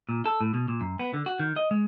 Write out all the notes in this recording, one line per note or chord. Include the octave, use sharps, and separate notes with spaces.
A#2
A4
A2
B2
A#2
F#2
B3
D3
F#4
D#3
D#5
G#3